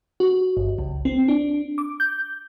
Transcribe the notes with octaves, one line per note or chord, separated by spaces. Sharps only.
F#4
G1
C#2
C4
D4
D6
G6